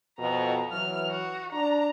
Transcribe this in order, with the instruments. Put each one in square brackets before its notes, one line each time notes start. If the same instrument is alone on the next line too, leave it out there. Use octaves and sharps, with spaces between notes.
[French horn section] F2 B2 [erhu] A#5
[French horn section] E3 F#3 [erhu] F6
[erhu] F#4
[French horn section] D4 [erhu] A#5